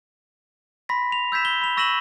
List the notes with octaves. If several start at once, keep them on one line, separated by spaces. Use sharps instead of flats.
B5 C6 A#6 B6
F7
E6 G6 G#6 B6 E7
G7
B5 F7
C#6 E6 A#6 D#7 E7 F#7